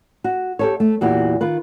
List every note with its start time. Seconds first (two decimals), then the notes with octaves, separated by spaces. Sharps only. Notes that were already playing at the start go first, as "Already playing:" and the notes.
0.24 F#4
0.59 G4 A4 C#5
0.80 A3
1.01 E2 A#2 E4 F#4 G4
1.41 D#3 F4 B4